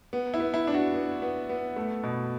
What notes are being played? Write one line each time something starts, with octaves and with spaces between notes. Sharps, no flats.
B3
E4
B3
E4
D4
F#4
B3
B3
B3
A3
B2